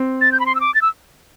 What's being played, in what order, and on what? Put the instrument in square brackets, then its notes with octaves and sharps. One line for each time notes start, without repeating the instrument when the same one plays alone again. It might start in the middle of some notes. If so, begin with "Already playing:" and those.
Already playing: [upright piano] C4
[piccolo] A6
G6
B5
C6
E6
D6
A6
E6